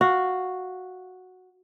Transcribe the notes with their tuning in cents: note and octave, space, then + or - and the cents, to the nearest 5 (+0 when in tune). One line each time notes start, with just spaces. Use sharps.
F#4 -5 F5 +5